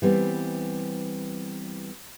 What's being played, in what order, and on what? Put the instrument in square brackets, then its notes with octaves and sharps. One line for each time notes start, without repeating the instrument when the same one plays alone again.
[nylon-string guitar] E3 G3 B3 C4